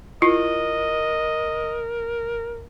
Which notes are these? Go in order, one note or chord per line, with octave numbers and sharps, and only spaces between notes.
E4 F4 A#4 D#5